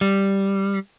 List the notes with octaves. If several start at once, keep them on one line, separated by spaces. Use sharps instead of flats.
G3